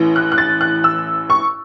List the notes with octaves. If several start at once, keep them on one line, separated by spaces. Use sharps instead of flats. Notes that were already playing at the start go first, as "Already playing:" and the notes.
Already playing: A1 A2 E3
F#6
F#6
A6
F#6
E6
C#6